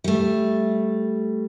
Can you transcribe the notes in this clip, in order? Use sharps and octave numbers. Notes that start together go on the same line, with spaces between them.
G3 A3